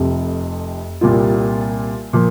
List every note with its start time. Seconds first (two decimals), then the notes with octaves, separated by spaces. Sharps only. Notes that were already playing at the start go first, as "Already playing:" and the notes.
Already playing: F1 F2 C3
1.01 C2 A#2 G3 A#3 F4
2.13 A#2 F3 A#3